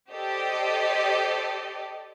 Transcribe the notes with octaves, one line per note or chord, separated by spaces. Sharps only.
G4 A4 C5 D5 D#5